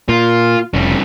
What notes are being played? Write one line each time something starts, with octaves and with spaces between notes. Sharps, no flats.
A#2 F4
F1 C#3 G3